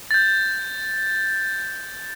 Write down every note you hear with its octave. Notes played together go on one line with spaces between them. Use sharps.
G6 A6